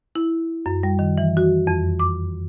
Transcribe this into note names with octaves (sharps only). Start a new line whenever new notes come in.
E4
F#2
G3
D#3
E3
F#4
F2
D6